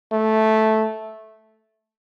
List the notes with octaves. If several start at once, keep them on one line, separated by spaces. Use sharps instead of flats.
A3